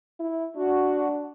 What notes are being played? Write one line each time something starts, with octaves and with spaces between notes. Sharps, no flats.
E4
D4 F#4